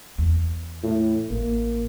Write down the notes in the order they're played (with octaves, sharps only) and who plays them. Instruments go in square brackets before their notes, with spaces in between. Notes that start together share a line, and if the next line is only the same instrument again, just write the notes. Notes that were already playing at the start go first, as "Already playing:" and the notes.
[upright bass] E2
[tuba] A2
[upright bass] A1 [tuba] A#3